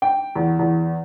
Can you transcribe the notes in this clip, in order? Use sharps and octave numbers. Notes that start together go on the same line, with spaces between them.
G5
E2
E2